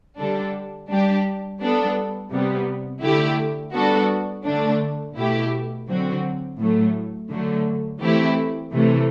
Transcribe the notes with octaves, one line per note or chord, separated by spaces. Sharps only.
D3 G3 D4 A4
G3 D4 G4
G3 B3 D4 A4
C3 G3 B3
D3 A3 E4 G4
G3 B3 D4 F#4 A4
D3 A3 D4
B2 A3 E4 G4
D3 F#3 C4 F#4
A2 F#3 A3
D3 F#3 A3
E3 A3 C4 E4 G4
C3 E3 A3